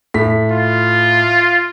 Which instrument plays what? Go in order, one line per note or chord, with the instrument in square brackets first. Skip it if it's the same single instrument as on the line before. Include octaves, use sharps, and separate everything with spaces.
[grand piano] A2 B6
[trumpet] F4